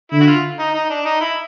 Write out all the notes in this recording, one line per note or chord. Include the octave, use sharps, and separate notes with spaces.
D3 E4
F#4
F4
D#4
D#4
D4
D#4
E4